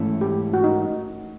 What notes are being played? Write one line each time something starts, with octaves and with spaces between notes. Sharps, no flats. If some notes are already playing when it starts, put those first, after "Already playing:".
Already playing: G#2 E3 A3 C#4 E4
G4
F#4
D#4